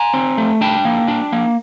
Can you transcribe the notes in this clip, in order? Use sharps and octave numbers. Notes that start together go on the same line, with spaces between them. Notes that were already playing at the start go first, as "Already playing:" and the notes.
Already playing: G#5 A#5
C4
A3
D4 G5 A5
A#3
D4
A#3